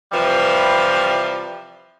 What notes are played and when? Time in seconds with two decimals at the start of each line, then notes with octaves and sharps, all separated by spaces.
0.12 C3 E3 F3 G3 B4